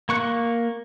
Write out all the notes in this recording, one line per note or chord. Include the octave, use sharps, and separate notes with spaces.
A#3 C#6 F#6